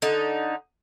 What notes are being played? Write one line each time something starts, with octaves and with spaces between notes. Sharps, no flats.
D3 D#4